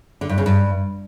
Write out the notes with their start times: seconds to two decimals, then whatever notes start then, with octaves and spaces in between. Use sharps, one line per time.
0.21 D3
0.29 G2
0.38 C#3
0.46 G2